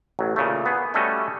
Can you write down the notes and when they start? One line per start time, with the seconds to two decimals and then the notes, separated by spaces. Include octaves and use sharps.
0.19 A1 F#3
0.36 A#2 C#3 A3
0.66 B3 G#4
0.94 G3 A3 C#4 F#4 A4 D#5